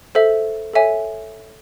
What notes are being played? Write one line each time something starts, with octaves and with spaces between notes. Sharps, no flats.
A4 C5 E5
A4 C#5 E5 G#5